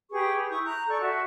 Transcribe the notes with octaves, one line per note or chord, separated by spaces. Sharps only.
G4 G#4 B4 C#6
E4 C#6 D#6 G6
A#5 F#6 G6
A4 D5 C#6
F#4 E5 A5